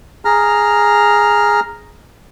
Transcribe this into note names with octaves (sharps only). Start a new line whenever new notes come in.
G#4 A#5 F6